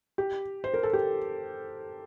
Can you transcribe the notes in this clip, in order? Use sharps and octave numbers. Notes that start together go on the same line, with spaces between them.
G4
C5
A#4
A4
G4